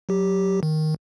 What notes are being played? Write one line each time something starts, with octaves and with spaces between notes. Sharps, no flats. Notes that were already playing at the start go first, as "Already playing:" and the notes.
F#3 G4
D#3